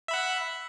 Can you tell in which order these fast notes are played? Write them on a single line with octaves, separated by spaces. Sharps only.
E5 B5 F#5